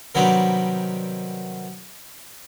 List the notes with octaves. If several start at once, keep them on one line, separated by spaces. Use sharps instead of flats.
C3 D#3 F#3 G3 B3 D4